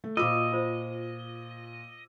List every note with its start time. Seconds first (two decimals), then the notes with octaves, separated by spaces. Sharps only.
0.04 A3
0.17 A#2 F4 F#4 C5 D#5 D6 E6
0.53 F4 C5